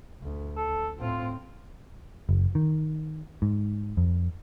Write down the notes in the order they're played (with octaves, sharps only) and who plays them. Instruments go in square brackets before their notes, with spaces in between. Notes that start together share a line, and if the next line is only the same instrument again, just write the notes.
[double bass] D2
[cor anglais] A4
[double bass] A2 C4 [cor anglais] F4
[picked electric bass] F#1
D#3
G#2
F2